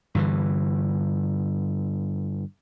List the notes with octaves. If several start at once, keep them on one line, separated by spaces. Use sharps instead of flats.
G2 D3 E3